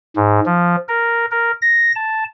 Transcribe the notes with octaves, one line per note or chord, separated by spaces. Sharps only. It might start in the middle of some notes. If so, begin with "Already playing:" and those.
G#2
F3
A#4
A#4
A#6
A5